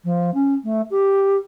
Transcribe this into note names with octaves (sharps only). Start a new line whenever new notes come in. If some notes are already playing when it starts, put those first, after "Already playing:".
F3
C#4
A3
G4